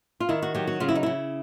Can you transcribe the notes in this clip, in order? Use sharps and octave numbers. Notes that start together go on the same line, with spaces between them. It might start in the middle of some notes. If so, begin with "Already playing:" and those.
F4
D#3 E4
F#4
F#3 G4
F#4
C#3 F4
E4
D#4
C#3 E4